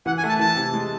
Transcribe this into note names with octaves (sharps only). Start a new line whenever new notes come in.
E3 F#5
G#5
A3
A5
E3 A5
C3
G#3